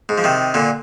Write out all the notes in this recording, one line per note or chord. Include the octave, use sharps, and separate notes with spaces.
G#2
F3
C3 D#3
A#2 D3